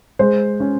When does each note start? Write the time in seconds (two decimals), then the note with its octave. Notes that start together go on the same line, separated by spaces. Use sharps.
0.19 G#3 C5
0.60 C#4